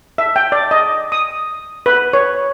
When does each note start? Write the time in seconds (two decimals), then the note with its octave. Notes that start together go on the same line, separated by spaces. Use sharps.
0.18 E5
0.36 G5
0.52 D5
0.71 D#5
1.12 D#6
1.86 B4
2.13 C#5